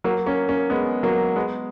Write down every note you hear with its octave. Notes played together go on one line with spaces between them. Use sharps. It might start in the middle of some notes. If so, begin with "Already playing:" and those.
F#3 A#3
A#3 C#4
A#3 C#4
G#3 B3
F#3 A#3
G#3 B3